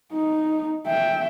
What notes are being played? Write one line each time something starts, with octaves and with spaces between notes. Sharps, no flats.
D#4
E5 G5